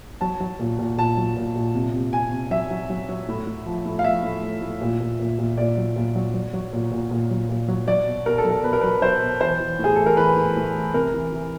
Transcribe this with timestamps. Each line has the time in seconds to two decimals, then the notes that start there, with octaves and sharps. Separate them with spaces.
0.21 F#3 A5
0.40 F#3
0.59 A#2
0.79 A#2
0.98 A#2 A5
1.17 F#3
1.37 A#2
1.56 A#2
1.74 C3
1.93 C3
2.13 C3 G#5
2.32 C3
2.51 F#3 E5
2.71 F#3
2.90 F#3
3.09 F#3
3.28 A2
3.47 A2
3.66 F3
3.85 A2
3.99 F5
4.04 F3 E5
4.23 A2
4.43 A2
4.61 A2
4.82 A#2
5.00 A#2
5.19 A#2
5.39 A#2
5.57 A#2 D5
5.77 F#3
5.96 A#2
6.15 F#3
6.34 F#3
6.53 F#3
6.73 A#2
6.91 A#2
7.11 A#2
7.31 F#3
7.49 A#2
7.68 F#3
7.87 F#3 D5
8.06 B2
8.25 B2 A#4
8.38 A4
8.45 F#3
8.50 A#4
8.63 B2 B4
8.73 A#4
8.81 F#3 B4
9.02 F#3 C5
9.21 B2
9.41 E3 C5
9.60 E3
9.79 A2 G#4
9.96 E3 A4
10.06 A#4
10.17 E3 B4
10.36 A2
10.56 A2
10.75 E3
10.93 C3 A#4
11.13 E3
11.32 E3